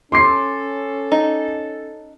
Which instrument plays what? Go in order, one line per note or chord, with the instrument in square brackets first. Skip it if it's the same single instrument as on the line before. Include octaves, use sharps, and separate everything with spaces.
[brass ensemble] C#4 A4 [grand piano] C6 D6 C7
[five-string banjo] D#4